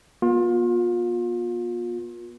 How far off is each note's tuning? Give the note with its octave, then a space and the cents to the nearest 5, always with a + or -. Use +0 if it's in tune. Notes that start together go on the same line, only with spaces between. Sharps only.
B3 -45 F4 +30